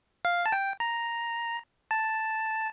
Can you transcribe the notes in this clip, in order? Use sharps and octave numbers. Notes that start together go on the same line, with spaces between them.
F5
A5
G5
A#5
A5